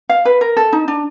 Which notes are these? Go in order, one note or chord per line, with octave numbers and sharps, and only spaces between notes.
F5
B4
A#4
A4
D#4
D4